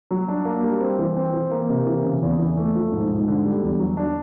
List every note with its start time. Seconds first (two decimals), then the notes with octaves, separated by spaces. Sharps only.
0.11 F#3
0.28 D4
0.45 A#3
0.63 G3
0.81 C4
0.99 E3
1.17 C4
1.33 E3
1.51 A#3
1.70 C3
1.86 E3
2.04 C#3
2.22 E2
2.39 E3
2.57 A3
2.75 F3
2.92 G#2
3.09 G#2
3.28 D3
3.45 G3
3.63 E2
3.80 F#3
3.97 D4